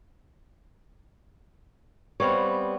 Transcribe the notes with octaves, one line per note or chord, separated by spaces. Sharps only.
G3 B3 C4 C#5 F5